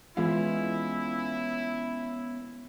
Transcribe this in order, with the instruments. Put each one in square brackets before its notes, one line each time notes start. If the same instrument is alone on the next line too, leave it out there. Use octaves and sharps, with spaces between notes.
[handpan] E3 G#3 F4 [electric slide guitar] B3 C#4 F5 [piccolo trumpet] E4